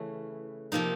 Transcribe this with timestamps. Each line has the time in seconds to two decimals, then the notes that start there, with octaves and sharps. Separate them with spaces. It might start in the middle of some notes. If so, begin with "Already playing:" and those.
Already playing: C#3 E3 A3 C#4
0.72 C3 F3 A#3 D#4